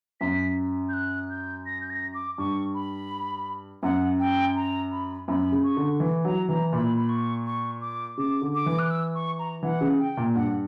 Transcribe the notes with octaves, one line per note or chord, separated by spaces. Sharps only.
F#2 B6
G6
F#6
G6
A#6
G6
A#6
D6
G2 C#6
B5
F#2 F#5
G5
A#5
B5
F#2 B5
C#3
C#6
D3
E3
F#3 A#5
E3 A#5
A#2 B5
B5
C#6
C#6
D6
C#3 D6
D3
D6
E3
F#6
E6
C#6
A#5
E3 F#5
C#3
G5
A#2
G2 F#5